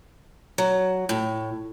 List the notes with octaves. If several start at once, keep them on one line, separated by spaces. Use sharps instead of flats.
F#3
A2